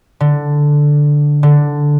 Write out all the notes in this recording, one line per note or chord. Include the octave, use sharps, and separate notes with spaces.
D3
D3